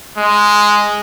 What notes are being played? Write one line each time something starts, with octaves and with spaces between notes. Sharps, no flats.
G#3